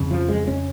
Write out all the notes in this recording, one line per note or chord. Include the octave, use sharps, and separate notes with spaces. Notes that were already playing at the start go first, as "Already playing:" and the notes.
Already playing: F2 C#3
F3
G#3
C#4